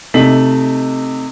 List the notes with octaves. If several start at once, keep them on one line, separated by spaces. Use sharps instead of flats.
C3 A3 D#4 B6 F#7